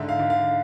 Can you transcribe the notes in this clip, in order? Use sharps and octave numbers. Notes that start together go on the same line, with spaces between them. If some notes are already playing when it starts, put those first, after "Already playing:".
Already playing: G#2 D3 E5
F5
D3
F5